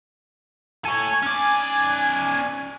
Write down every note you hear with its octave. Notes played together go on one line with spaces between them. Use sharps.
A4 C#5 G#5
C#4 D5